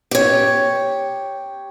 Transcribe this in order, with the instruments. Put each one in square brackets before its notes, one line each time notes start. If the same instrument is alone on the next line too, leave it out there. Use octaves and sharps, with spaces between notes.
[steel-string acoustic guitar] G4 C#5